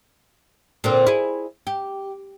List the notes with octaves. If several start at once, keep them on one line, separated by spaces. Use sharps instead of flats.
A#2 D3 C4
E4 G#4
G4